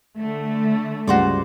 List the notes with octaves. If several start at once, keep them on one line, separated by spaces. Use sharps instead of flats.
D3 A3
C#2 G2 F#4 C5 D5